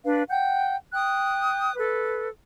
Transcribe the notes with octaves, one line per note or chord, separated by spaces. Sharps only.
D4 B4 F5
F#5 G5 G6
G5 D#6 F#6
A4 B4